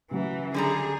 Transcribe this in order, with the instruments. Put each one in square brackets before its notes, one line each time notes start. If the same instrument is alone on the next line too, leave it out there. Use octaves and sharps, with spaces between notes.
[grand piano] C#3 F#3 [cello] E3
[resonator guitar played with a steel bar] D3 G3 A#5 [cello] G#4